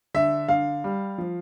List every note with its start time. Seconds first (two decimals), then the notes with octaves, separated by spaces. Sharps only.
0.14 D3 E5
0.49 D3 F5
0.84 G3
1.18 F3